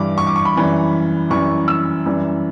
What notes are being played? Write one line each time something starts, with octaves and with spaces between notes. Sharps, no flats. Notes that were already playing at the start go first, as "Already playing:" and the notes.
Already playing: G2 E3 G3 D6
C#6
D6
C#6
B5
F#2 E3 G3
F#2 E3 G3 C#6
E6
F#2 E3 G3